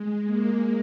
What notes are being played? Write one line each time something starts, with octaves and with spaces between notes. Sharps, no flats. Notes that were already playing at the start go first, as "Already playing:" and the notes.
Already playing: G#3
G#3 A#3